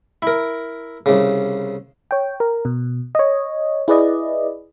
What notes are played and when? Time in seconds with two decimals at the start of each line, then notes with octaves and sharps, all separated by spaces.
0.22 E4 A#4
1.06 C2 C#3
2.11 C#5 G5
2.40 A#4
2.65 B2
3.15 C#5 D#5
3.88 E4 G#4 B4 D5 D#5